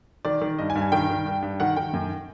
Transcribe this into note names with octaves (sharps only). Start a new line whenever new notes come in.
D#3 D5
D#3
G2 D#5
G#5
G2
G#5
D#3 G5
D#3
G2
G2
D#3 F#5
D#3 G5
F#2